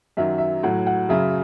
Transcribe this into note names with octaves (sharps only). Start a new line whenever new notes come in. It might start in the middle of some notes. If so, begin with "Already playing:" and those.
F#2 D#3 F#3 E5
E5
A2 F#3 F#5
F#5
F#2 C#3 F#3 E5